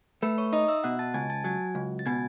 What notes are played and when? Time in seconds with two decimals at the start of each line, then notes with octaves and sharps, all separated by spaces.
0.22 A3 B4 B5
0.38 C#5 C#6
0.53 D#4 D#5 D#6
0.68 E5 E6
0.83 B2 F#5 F#6
0.99 A5 A6
1.14 C#2 G#5 G#6
1.30 A5 A6
1.44 F#3 G#5 G#6
1.75 C#2
1.99 A6
2.06 B2 G#5 G#6